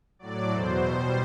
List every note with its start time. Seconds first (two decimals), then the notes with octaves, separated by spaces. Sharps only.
0.19 A2 F#3 D5
0.51 E2 B2 F#3 C5
0.83 B2 G3